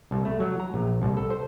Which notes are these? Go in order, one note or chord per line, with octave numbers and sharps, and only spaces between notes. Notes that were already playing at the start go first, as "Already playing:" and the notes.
C2
A3
F#3
A#5
A#1
C2
A4
C5